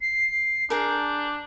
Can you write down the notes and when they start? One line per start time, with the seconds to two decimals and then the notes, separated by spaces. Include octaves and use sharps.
0.01 C7
0.70 D4 G#4 A#4 G6